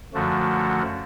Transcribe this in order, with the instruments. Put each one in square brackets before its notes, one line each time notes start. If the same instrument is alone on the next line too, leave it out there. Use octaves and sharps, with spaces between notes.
[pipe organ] F#2 D3 F3 A3 F#4